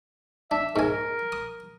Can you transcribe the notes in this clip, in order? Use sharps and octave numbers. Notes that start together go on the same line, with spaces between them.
D4 E5
G#2 A#4 G#5
D#6